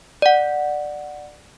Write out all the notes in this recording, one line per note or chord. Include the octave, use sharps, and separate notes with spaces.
D5 F#5